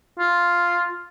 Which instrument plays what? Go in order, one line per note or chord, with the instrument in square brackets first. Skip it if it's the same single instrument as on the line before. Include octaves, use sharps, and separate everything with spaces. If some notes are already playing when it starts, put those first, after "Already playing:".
[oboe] F4